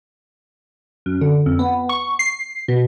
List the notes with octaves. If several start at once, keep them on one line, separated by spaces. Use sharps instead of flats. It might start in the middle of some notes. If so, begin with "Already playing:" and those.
F#2
D3
F2
B3
C#6
C7
B2